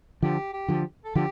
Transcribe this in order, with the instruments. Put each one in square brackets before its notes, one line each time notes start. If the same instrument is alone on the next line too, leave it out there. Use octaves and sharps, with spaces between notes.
[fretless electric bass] D3 F3 [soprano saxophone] G4
[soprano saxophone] G4
[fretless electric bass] D3 F3
[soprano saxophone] A4
[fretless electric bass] D3 F3 [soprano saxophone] G4